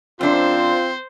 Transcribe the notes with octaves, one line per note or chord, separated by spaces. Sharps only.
F#2 C4 D4 F4 C5